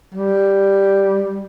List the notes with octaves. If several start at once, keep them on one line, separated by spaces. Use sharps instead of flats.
G3